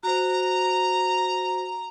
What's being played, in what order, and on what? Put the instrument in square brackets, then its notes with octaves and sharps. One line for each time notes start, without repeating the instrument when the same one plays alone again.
[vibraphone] F#4 C5 [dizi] A#5